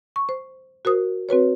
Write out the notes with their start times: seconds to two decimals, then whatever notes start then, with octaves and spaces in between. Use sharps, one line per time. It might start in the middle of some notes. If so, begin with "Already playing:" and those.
0.16 C#6
0.29 C5
0.85 F#4 A#4 C5 D#6
1.29 C4 F#4 B4 C#5